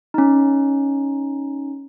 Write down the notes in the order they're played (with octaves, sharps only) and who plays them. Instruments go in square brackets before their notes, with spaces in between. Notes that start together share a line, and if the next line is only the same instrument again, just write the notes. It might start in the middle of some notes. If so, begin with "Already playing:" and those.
[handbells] C#4 D#4